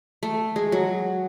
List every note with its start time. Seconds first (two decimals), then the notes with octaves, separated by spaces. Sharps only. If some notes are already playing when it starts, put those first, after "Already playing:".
0.23 A3
0.56 G#3
0.72 F#3